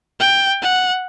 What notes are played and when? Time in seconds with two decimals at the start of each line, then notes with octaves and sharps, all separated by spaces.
0.20 G5
0.62 F#5